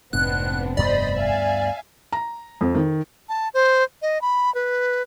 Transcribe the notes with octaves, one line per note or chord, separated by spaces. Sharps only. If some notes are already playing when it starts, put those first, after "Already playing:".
F1 G#2 B3 C4 D4 F#6
D2 G2 B3 C5 D5 D#5 B5
E5 F5 G#5
A#5
F2
D#3
A5
C5
D#5
B5
B4